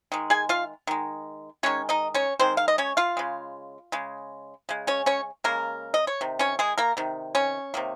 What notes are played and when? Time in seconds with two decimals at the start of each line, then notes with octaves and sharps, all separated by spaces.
0.12 D#3 G#3
0.30 G#4 G#5
0.49 F4 F5
0.87 D#3 G#3
1.63 D#3 G#3 C#4 C#5
1.89 D#4 D#5
2.14 C#4 C#5
2.39 D#3 G#3 C4 C5
2.57 F5
2.68 D#5
2.78 C#4 C#5
2.97 F4 F5
3.17 C#3 G#3
3.92 C#3 G#3
4.69 C#3 G#3
4.87 C#4 C#5
5.06 C#4 C#5
5.44 C#3 G#3 A#3 A#4
5.94 D#5
6.07 C#5
6.21 C3 D#3
6.39 C#4 C#5
6.59 G#3 G#4
6.78 A#3 A#4
6.97 C3 D#3
7.35 C#4 C#5
7.74 C3 D#3 A#3